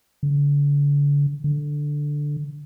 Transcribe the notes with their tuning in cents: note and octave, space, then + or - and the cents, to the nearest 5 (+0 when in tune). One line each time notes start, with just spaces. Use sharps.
D3 -40
D3 +0